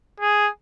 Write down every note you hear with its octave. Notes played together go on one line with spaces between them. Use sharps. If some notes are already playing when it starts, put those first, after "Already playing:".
G#4